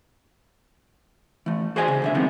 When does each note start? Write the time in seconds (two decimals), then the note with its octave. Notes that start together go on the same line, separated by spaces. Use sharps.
1.46 E3 A3
1.76 F#4 G#4 C5 D5 D#5 G#5
1.88 C#3
2.02 B1 D3 E5
2.15 C3 D#3 E3 G3 G#3 B3